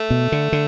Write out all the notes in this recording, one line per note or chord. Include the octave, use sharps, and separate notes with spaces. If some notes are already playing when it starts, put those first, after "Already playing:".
Already playing: A3
B2
D3
D3